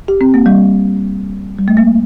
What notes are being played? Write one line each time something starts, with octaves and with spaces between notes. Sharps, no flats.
G4
C4
A#3
G3
G3
A3
A#3